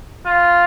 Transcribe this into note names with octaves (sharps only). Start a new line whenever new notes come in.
F4